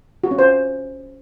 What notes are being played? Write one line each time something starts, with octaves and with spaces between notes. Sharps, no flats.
F#4
C#4
C5